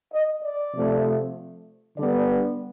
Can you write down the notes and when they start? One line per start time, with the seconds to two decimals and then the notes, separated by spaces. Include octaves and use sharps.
0.13 D#5
0.44 D5
0.74 C3 F3 A3
1.98 D3 G3 B3 D5